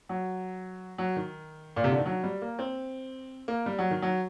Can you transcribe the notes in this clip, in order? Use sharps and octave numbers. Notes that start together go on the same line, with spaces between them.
F#3
F#3
D#3
A#2
C3
D3
D#3
F#3
G3
A#3
C4
A#3
G3
F#3
D#3
F#3